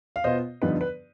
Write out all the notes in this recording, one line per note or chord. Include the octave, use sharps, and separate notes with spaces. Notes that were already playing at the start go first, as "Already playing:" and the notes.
F5
B2 B3 F4 C5 D#5
G2 D3 F3 B3 D#4 B4
B4